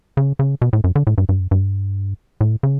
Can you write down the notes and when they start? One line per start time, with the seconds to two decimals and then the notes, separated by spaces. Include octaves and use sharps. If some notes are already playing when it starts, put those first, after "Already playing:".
0.17 C#3
0.39 C#3
0.62 B2
0.73 A2
0.84 F#2
0.96 D3
1.07 A2
1.18 G2
1.29 G2
1.40 F#2
1.51 G2
2.41 A2
2.63 C#3